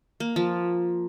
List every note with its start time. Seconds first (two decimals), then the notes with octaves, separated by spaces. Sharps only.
0.20 A#3
0.36 F3